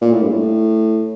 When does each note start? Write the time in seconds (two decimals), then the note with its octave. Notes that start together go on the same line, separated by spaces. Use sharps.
0.02 A#2
0.12 A2
0.23 G2
0.32 A2